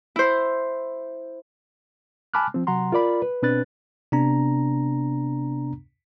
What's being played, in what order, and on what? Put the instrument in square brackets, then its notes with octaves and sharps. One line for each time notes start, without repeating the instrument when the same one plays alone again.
[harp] E4 C5
[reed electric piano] G#5 A5 B5 D6 F6 F#6
F3 C4
C3 F#3 F#5 A#5 C6
F4 A#4 D5 B5
B4
B2 C4 D4 B4 F#6 A6
[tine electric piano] C3 B3 D4 A#5